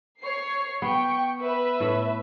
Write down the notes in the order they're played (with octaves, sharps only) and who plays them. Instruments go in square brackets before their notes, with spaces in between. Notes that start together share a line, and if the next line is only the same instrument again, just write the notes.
[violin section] C#5 C7
[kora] B3 [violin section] G5 C#6
[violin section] B4 E5
[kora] A2